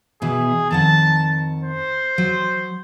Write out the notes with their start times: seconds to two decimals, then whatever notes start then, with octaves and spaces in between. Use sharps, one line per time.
0.22 B2 E3 G#4
0.71 F2 D#3 F#5 A5
1.64 C5
2.18 F#3